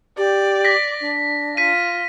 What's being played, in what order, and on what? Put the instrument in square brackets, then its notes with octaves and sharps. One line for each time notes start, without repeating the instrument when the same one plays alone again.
[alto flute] G4 [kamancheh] D5
[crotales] A#6 B6
[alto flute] D4
[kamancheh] F4 [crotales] B6 D#7